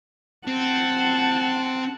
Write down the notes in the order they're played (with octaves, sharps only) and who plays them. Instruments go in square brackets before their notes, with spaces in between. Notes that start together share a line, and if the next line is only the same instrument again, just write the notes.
[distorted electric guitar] C4 [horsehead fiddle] F#5 A5